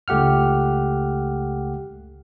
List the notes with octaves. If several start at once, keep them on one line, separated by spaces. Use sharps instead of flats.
C#2 A3 G4 F#5 F6